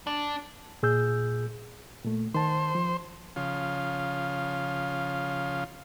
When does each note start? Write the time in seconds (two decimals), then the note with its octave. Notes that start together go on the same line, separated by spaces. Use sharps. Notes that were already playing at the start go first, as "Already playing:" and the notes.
0.07 D4
0.83 A#2 G#4 E6 G6
2.05 A#2 A3
2.34 D#3 C5 A5
2.75 F3
3.36 C#3 F3 F4